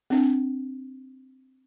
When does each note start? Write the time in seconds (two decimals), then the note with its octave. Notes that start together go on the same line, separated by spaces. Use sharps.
0.10 C4 D4